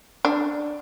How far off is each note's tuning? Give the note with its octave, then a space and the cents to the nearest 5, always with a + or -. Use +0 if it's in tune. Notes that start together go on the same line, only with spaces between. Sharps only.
D4 +10